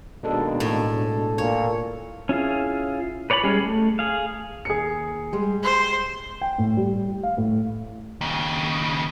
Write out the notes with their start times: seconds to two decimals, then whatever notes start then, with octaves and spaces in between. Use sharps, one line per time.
0.23 D#2 B2 G#3 D4 A4
0.60 A2 A4
1.38 A#2 C#5
2.29 C#4 E4 F4 G#4
3.30 B4 C#5 D5 G5 B5
3.43 G3 G#3 C#4 G#4
3.61 A3
3.99 G#4 F5
4.65 D#2 G#4 C#7
5.32 G3 G#3 G4
5.63 C5
6.41 G5
6.58 A2
6.77 G3
7.23 F5
7.37 A2
8.21 D#2 C#3